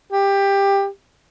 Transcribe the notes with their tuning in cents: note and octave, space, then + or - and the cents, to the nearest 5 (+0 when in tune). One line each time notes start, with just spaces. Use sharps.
G4 +15